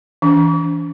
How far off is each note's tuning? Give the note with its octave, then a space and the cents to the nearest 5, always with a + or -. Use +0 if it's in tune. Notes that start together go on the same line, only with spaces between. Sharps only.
E3 +0 D4 -40